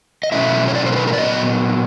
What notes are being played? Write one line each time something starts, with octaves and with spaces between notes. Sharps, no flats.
D#5
B2 F#3 A3 C#4 E4 E5
C#5
D5
C5
A#4
B4
A#4
D5
A#2 F#3 B3 D#5